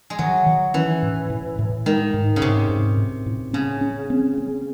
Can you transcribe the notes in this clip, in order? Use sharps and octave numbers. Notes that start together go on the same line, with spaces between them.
G#3
D#3 F#3
D#3
E3 C#4
A2
A2
A2
D#3 G#3
G#2
C#3
G#2 C3
G#2
A2
A2
C#3 C#4
C#4
C4
C4